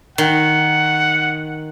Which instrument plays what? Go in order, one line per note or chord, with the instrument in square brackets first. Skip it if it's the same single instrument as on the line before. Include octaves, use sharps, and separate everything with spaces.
[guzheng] D#3 [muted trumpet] F#5